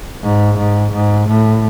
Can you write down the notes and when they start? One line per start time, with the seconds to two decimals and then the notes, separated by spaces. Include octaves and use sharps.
0.24 G#2
0.58 G#2
0.93 G#2
1.28 A2